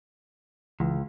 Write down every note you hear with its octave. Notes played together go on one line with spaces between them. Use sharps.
C#2 E3